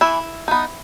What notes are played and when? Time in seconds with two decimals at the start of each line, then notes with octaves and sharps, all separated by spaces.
0.01 E3 E4
0.48 B3 D#4